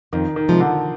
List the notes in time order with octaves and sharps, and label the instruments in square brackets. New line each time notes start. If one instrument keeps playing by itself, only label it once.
[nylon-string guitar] F2 [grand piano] D#3
[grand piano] D#3
[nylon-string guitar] C3 F3 G#3
[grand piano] D3